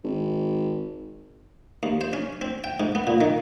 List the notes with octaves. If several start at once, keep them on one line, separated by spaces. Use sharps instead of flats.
G#1
D#2
C5
C#4
C4
G5
G#2
B3
A#2
D#3